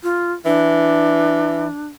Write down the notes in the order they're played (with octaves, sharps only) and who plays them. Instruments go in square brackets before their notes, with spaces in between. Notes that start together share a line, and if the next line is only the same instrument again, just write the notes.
[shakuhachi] F4
[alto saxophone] E3 [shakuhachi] D4